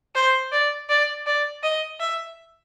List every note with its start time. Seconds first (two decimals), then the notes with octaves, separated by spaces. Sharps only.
0.15 C5
0.52 D5
0.89 D5
1.26 D5
1.63 D#5
2.00 E5